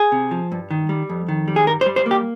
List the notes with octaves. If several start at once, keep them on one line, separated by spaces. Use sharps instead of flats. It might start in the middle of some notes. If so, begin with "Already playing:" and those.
Already playing: G#4
C3
F3
G2
D#3
G3
F2
D#3
G3
G#4
G2 A#4
C5
G3
C5
A#3
G4